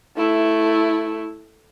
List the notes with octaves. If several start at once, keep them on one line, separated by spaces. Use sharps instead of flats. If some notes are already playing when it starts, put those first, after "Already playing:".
A3 E4